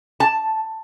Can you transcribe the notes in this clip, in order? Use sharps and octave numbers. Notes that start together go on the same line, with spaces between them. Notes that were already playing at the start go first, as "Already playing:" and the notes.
A5